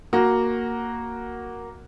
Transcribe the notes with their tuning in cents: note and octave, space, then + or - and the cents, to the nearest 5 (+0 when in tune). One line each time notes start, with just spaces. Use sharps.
A#3 +0 F#4 +0